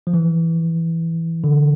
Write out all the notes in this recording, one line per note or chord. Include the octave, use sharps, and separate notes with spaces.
F3
E3
D3